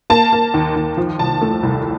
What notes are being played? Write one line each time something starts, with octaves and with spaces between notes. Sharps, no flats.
A#3 A5
A#3
D#2
D#2
F3
C2 A5
A3
C2